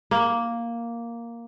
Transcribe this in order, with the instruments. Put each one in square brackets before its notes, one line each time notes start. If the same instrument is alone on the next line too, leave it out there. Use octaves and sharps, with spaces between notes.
[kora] A#3